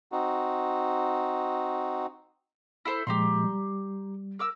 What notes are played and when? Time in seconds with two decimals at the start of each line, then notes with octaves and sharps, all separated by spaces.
0.12 C4 D#4 F#4
2.85 E4 A4 C5
3.07 A#2 F3 G#3 G4 A#5 C6
3.44 G3
4.39 A#4 D6 E6